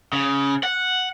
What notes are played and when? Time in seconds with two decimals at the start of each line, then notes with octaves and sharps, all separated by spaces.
0.13 C#3
0.63 F#5